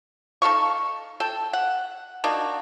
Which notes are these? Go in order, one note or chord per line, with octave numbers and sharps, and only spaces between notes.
D#4 A4 F5 C#6
A4 G5
F#5
A#3 D4 D#4 F#4